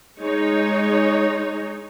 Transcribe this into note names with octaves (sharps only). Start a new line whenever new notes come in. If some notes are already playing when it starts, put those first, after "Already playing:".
G#3 D#4 C#5